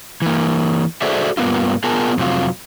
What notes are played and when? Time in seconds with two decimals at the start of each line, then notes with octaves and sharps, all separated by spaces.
0.22 E3 A#3
1.02 F#4 G#4 A4 C5 D5 E5
1.37 G2 A#3 B3 E4 F4
1.84 B3 F4 G#4 A#4 G#5 A5
2.18 F2 C3 F#3 F4